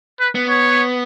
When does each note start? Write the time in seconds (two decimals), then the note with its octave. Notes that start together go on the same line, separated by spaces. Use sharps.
0.20 B4
0.35 B3
0.49 C#5